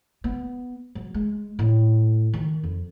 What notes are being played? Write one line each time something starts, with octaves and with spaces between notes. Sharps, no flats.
B3
F#3
G#3
A2
D#3
F2